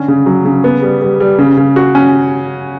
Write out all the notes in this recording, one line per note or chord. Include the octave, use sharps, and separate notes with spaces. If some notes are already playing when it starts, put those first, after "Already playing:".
Already playing: D3 C#4
C#3
F#3
C#3
B3
G3
G3
G3
C#3
C#3
F#4
C#4